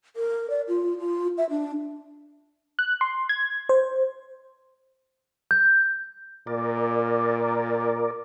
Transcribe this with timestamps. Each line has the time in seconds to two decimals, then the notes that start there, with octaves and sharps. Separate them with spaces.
0.16 A#4
0.50 D5
0.68 F4
0.99 F4
1.38 E5
1.50 D4
2.79 F#6
3.01 C6
3.29 G#6
3.69 C5
5.51 G6
6.47 A#2 A#4 D5